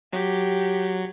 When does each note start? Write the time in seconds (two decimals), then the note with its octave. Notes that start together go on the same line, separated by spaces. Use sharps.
0.13 F#3 G4